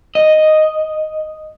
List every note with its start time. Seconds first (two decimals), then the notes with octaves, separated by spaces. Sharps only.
0.15 D#5